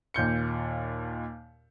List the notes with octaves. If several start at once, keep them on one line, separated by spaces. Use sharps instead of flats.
D#2 A#2 G6 C#7